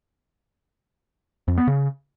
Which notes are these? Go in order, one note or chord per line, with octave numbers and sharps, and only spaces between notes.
F2
B3
C#3